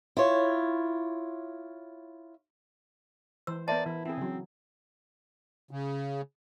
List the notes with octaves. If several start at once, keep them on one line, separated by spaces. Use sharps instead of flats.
E4 F4 C#5
E3 C5 E6
B3 A#4 C5 D5 E5 A5
E3 E4
C4 E4 G#4
C#3 F#3
C#3